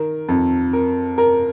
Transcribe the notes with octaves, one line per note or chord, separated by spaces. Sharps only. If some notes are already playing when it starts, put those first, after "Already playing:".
Already playing: D#3 A#4
F2
A#4
A#4